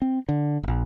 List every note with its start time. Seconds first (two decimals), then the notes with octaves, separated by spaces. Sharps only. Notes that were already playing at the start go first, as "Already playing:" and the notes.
0.02 C4
0.29 D3
0.63 E1 A#1